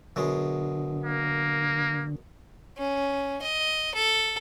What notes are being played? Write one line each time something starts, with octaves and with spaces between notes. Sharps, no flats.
F#2 B2 D3 G#3
A#3
C#4
D#5
A4